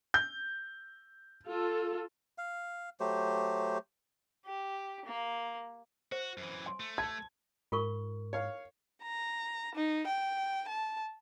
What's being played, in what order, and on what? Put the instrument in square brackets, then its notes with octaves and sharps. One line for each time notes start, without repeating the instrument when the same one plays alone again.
[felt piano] G6
[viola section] F4 A4
[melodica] F5
F#3 A3 G4 C5
[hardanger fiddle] G4
A#3
[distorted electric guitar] F#4 [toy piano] C5
[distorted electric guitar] F#2 E3
[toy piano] G#5 C6
[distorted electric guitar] A3
[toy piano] A5 [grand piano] G#6
[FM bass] G#2 [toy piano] F4 A#4 C#6
[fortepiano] C#5 F5
[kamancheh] A#5
D#4
G5
A5